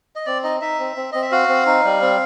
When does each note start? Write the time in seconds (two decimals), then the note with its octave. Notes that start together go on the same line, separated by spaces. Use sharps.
0.16 D#5
0.26 C4 D5
0.44 D#4 D#5
0.61 D#4 E5
0.80 C4
0.96 C4
1.12 C4 D#5
1.22 E5
1.31 F#4 F5
1.49 C4
1.67 D#4
1.85 G3
2.02 C4